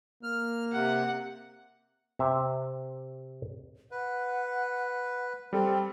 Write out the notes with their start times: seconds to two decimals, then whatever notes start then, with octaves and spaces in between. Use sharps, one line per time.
0.23 A#3 F6
0.73 C3 F#5
2.19 C3 E5
3.91 B4 F#5
5.53 G3 C4 A4